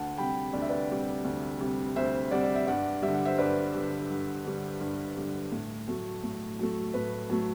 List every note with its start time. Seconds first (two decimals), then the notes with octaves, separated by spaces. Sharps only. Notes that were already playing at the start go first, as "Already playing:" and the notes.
Already playing: D2 F#5 A5
0.18 C3 G3 G5 B5
0.53 D2 D5
0.62 E5
0.69 B4 D5
0.90 C3 G3
1.25 D2
1.61 C3 G3
1.96 D2 C5 E5
2.31 C3 G3 D5 F#5
2.44 D5
2.55 E5
2.67 G2 D5 F#5
3.02 G3 E5
3.08 D3
3.14 F#5
3.25 C5 E5
3.38 G2 B4 D5
3.74 D3 G3
4.10 G2
4.45 D3 G3
4.81 G2
5.16 D3 G3
5.52 A2
5.88 F#3 A3
6.24 A2
6.59 F#3 A3
6.94 A2 B4
7.30 F#3 A3